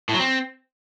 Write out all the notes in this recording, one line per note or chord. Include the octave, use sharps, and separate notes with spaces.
A2
F#3
C4